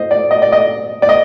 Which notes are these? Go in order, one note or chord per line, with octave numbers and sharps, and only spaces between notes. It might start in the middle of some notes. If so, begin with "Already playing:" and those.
Already playing: C5 D#5
D5
D#5
D5
D#5
D5
D#5